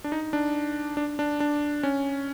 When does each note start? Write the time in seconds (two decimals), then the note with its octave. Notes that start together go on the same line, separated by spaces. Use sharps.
0.04 D4
0.12 D#4
0.33 D4
0.97 D4
1.19 D4
1.40 D4
1.83 C#4